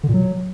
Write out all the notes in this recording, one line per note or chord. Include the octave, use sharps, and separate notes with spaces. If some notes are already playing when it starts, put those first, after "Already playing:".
D3
A#2
F#3